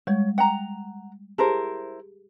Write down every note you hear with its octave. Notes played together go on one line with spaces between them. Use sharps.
G3 G#3 C#5
F#5 G5 A#5
E4 G4 G#4 A#4 C5 A5